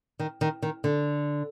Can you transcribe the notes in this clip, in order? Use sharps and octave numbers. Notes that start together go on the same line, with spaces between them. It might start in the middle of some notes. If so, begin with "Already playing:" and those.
D#3
D#3
D#3
D3